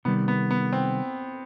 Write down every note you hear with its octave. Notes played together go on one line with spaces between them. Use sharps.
C3 D#3 G3 B3
B3
B3
C4